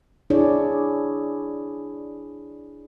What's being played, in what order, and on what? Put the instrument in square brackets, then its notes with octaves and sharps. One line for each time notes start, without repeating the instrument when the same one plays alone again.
[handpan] D4 E4 G#4 C#5 D5